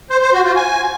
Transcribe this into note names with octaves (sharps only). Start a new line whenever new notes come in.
C5
C5
F#4
F4
G#5